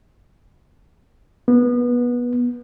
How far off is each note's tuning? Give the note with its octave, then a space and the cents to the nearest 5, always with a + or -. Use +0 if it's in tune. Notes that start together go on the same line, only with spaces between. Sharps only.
B3 -20